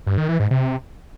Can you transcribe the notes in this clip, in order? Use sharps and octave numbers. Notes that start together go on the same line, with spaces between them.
G2
D#3
E3
G#2
C3